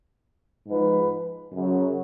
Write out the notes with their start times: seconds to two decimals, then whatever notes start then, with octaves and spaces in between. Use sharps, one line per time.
0.67 G#2 F3 B4
1.53 F#2 C#3 F#3